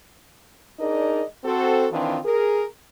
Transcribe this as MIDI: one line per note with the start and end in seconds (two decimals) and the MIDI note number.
0.79 1.22 62
0.79 1.22 63
0.79 1.22 68
0.79 1.22 70
0.79 1.22 74
0.79 1.22 75
1.44 1.87 60
1.44 1.87 66
1.44 1.87 69
1.92 2.17 51
1.92 2.17 52
1.92 2.17 60
1.92 2.17 62
1.92 2.17 65
2.25 2.64 68
2.25 2.64 70